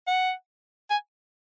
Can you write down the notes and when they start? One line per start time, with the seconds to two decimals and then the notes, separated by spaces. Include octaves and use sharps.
0.07 F#5
0.90 G#5